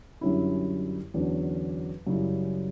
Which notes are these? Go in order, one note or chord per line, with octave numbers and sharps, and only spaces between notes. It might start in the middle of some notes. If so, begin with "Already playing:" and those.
F#2 D3 G3 C#4 E4
E2 D3 F#3 C#4
F#2 C#3 G3 C#4 E4